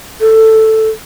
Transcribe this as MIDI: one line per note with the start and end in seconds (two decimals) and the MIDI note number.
0.21 0.88 69